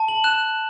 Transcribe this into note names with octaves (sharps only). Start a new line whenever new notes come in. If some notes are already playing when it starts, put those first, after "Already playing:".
Already playing: A5
F#7
F#6 E7